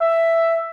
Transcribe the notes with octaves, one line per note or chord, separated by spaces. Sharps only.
E5